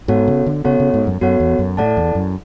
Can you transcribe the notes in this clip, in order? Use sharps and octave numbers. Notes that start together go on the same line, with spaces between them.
G#2 B3 F#4 A4 C#5 F#5
C#3
D3
C#3 B3 F#4 A4 C#5 F#5
C#3
G#2
F#2
F#2 B3 F#4 A4 C#5 F#5
E2
F#2
A2 E4 A4 D5 F#5 A5
E2
F#2